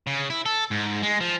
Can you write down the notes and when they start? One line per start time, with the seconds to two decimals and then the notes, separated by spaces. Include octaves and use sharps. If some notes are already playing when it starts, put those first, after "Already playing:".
0.07 C#3
0.30 E4
0.46 A4
0.71 G#2
1.03 G#3
1.21 F3